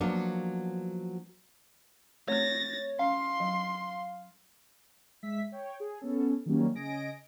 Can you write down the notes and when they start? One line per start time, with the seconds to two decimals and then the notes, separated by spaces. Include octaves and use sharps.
0.01 F3 F#3 A#3 B3 D4
2.28 A3 C4 C#5 A6 A#6
2.99 C#4 F5 C6
3.40 F#3
5.23 G#3 E5 B6
5.52 C#5 G5
5.80 G#4
5.99 B3 C#4 A4
6.46 D#3 F#3 G3 A#3 C#4
6.75 C#3 D#5 G#5 A#6 D7